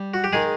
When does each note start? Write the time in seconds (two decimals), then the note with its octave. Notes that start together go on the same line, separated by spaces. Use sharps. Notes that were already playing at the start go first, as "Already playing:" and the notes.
Already playing: G3
0.14 F#4
0.24 G4
0.33 D#3 G#3 G#4